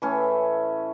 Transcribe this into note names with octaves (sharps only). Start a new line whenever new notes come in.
A2 E3 A3 C#4